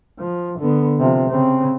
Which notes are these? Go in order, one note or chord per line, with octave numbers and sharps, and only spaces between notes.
F3
D3 B3
C3 F3
C#3 C4